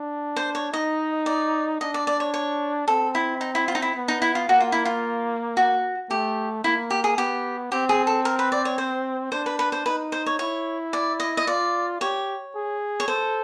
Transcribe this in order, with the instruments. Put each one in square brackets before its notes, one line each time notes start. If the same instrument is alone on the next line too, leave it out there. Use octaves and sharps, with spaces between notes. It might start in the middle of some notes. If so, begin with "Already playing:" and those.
Already playing: [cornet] D4
[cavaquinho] C5
C#5
[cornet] D#4 [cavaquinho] D#5
[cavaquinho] D5
[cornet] D4 [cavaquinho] D#5
[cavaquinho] D5
D5
C#5
C#5
[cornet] C4 [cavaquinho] A4
[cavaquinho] E4
D#4
E4
F4
D#4
E4
[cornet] B3
[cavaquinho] D#4
E4
F4
[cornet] A#3 [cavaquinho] F#4
[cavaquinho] F4
E4
F4
F#4
[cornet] A3 [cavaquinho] G4
[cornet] A#3 [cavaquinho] E4
[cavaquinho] G4
G#4
[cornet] B3 [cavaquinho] G4
[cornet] C4 [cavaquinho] G4
[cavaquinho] G#4
A4
A#4
B4
D5
C#5
C5
[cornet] D4 [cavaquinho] C5
[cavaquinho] B4
B4
C5
[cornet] D#4 [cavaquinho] B4
[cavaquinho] C5
C#5
[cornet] E4 [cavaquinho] C#5
[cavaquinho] D5
D#5
D#5
[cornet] F4 [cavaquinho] D5
[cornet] G4 [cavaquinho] C#5
[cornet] G#4
[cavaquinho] C#5
[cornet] A4 [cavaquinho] C5